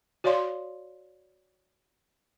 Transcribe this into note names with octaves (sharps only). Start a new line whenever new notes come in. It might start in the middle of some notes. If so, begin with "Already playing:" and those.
F#4 C#5 D5 F5 C6